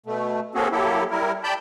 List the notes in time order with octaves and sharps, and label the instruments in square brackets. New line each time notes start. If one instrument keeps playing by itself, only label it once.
[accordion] B2 A3
A#3 C4 C#4 F#4 G#4 A4
F#3 A#3 E4 G4 A4
G3 E4 A#4
D5 G5 A5 B5 G6